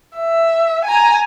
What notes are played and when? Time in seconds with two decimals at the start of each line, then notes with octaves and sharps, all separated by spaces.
0.17 E5
0.85 G#5 A#5